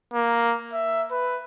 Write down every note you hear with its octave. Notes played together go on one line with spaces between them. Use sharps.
A#3
E5
B4